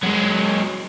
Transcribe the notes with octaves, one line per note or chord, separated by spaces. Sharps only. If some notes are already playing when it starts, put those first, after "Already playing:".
F#3 G#3